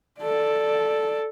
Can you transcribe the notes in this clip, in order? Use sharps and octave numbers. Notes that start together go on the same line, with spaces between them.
A4 D5